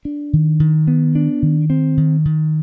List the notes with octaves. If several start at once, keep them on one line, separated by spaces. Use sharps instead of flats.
D4
D#3
D#3
B3
D4
D#3
C4
D#3
D#3